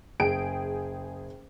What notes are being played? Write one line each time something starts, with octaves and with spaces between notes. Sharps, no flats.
F#1 G#4 G5 D7